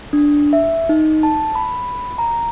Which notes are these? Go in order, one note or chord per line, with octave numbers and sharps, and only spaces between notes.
D4
E5
D#4
A5
B5
A#5